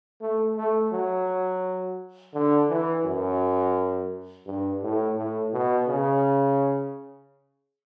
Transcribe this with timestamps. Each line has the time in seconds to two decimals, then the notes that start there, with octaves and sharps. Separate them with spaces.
0.21 A3
0.57 A3
0.93 F#3
2.34 D3
2.70 E3
3.05 F#2
4.46 G2
4.83 A2
5.18 A2
5.53 B2
5.88 C#3